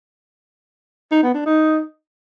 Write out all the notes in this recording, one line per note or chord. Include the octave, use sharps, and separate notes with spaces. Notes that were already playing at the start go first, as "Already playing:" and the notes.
D#4
B3
D4
D#4